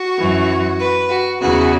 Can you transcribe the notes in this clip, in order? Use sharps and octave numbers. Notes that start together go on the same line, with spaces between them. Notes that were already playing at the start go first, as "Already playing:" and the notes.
Already playing: F#4
F#2 E3
B4
F#4
E2 C#3 E3 F#4